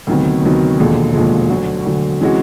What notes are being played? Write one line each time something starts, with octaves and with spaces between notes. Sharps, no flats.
D2 C3 D#3 F#3 B3
D2 C3 D#3 F#3 B3
E1 D#2 D3 F3 G#3
E1 D#2 D3 F3 G#3
D2 D3 F#3
D2 D3 F#3
C3 E3 G#3 C#4 F#4